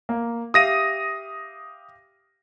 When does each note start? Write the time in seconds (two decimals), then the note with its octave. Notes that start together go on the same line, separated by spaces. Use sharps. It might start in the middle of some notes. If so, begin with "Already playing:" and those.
0.09 A#3
0.54 G4 E5 F5 D#6 A#6 D#7